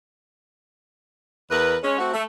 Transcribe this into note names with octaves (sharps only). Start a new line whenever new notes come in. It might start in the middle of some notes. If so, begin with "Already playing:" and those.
E2 A#4 B4
G#3 C#4
A3 C4 F#4
A3